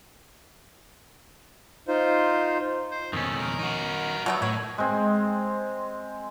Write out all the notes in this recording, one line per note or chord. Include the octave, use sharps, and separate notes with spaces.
D#4 F4 C5
C5
F2 B2 D#3 C#4 A4
A#4
D#4 F#4
B2 F#3 A3 B3
A2 C#5
G#3 C4